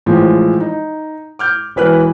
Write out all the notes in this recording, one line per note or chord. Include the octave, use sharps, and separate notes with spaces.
A2 E3 F3 G#3
D#4
D6 F6 G6
E1 E3 E4 B4 F6 F#6